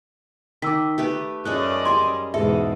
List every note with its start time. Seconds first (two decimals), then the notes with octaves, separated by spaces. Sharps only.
0.62 D#3 D6 E6 B6
0.98 A3 G4 B4
1.45 F#2 A3 C#4 G#4 D5 D#5 F#6
1.85 G3 G#4 G#5 C6
2.34 E2 G#2 B2 G#4 A4 E5